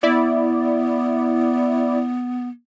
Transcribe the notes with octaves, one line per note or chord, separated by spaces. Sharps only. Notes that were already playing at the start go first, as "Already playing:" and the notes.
B3 E4 D5